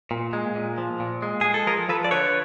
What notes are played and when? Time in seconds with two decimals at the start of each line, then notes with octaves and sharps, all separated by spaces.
0.11 A#2
0.33 G#3
0.56 A#2
0.78 F3
1.00 A#2
1.22 G#3
1.41 G#3 G#4
1.54 A4
1.67 F3 G#4 A#4
1.89 F3 A4 B4
2.04 D5
2.11 D3 B4 C#5